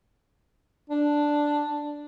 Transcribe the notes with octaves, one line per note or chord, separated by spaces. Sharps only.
D4